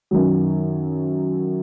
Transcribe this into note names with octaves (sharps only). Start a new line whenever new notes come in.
F#2 D#3 F#3